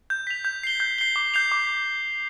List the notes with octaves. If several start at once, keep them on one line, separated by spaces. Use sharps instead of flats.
G6
B6 F7
G6
C7 G7
G6
C7 G7
D6
G6 C7 F7
D6